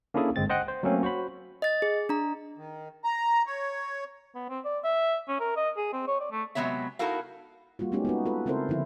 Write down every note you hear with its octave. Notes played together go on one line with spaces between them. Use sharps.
A#3 C#4 D4 E4 G#4 A4
G1 G#3 C4 A6
C5 D#5 F#5 G5 F#6
C5
F#3 A3 A#3 C4 C#4
F#4 C5 C#5 B5
D#5 A6
G#4
D4 A#5
D#3
A#5
C#5
B3
C4
D5
E5
C#4
A#4
D#5
G#4
C4
C#5
D5
A3
C3 F#3 G#3 B3 C#5 E5
D#4 E4 F#4 A4 A#4 F5
G3 A#3 F4 F#4
G#3 A3 B3 C#4 D#4 G4
B3 D#4 F#4
F4 A4 B4
C#3 C4 E4 A4 A#4 C5
D3 F3 E4